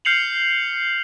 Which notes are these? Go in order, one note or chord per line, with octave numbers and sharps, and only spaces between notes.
F6 G6 C7 C#7 F7 F#7